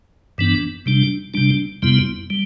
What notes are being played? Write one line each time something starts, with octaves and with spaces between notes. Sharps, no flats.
G2 E3 B3 D4
C3 G3 D4
C3 G3 D4
F2 C3 G3 B3 E4
G3